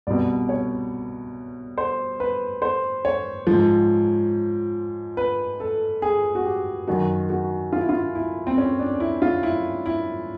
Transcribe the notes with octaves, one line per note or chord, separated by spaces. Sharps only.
C2 B2 D5
C#5
C5
B4
C5
C#5
G#2 F3
B4
A4
G#4
F#4
G4
F#2 D#3 F#4
F#4
F4
E4
F4
E4
C4
C#4
D4
E4
F4
E4
E4